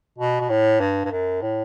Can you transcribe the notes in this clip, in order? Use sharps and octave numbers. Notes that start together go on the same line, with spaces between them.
B2
B2
A2
G2
G2
F#2
A2